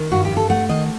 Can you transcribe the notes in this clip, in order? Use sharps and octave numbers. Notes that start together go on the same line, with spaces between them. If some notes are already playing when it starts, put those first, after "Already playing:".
Already playing: D#3
G2 F#4
G4
G2
A4
A3 F#5
D#3 D#5